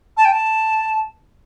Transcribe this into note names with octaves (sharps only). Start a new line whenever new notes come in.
A5
G5
A5